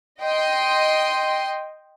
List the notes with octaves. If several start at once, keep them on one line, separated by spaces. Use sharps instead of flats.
D#5 G5 C6